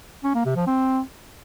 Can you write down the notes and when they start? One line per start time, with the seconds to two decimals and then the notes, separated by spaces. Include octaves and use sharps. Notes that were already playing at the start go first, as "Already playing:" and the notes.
0.24 C#4
0.35 A#3
0.45 C3
0.56 F3
0.67 C4